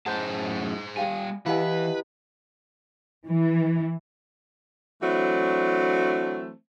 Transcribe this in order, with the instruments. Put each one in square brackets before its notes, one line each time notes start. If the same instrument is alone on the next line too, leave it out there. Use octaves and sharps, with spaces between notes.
[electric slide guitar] F#2 A2 A5 [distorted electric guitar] G#4 C5 [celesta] F#5 G6
[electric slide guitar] G3 G#5 [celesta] G4 F5 G5
[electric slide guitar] E3 [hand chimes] E4 G4 D#5 [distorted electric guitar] B4 [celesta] F5 F#5 G#5
[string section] E3
[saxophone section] E3 F#3 A3 C4 D4